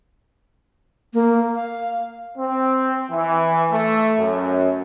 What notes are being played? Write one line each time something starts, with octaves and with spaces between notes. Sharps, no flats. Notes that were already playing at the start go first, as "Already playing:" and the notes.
A#3
F5
C4
E3
A3
F#2